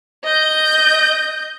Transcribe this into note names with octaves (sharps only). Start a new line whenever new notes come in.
D#5 G6